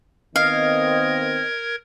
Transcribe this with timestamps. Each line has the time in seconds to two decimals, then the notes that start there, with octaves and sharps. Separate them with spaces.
0.36 D#3 B3 C4 A#4 D#5 F5 G#6